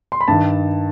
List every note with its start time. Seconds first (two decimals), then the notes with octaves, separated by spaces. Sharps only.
0.12 C6
0.21 B5
0.28 G2 D#3 A5